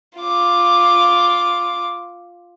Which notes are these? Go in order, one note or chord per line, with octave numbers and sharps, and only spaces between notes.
F4 D6